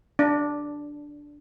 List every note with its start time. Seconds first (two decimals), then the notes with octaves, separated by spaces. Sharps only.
0.19 D4